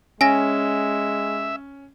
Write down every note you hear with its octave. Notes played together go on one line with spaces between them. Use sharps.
G#3 C#4 E5 G#5 A#6